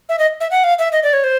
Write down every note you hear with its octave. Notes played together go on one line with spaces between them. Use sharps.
E5
D#5
E5
F#5
F5
E5
D#5
D5
C#5
C5